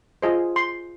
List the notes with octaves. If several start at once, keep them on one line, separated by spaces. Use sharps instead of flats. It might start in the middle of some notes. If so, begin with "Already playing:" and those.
F4 G#4 C5 D#5
C6